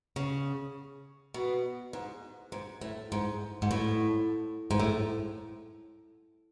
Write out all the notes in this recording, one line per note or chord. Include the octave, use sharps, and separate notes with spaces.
C#3
B2
G#2
G#2
A2
G#2
G#2
A2
G#2
A2